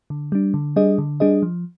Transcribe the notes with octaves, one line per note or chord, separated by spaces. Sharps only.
D3
G3 D4
D3
G3 D4 G#4 D#5
D3
G3 D4 G#4 D#5
F3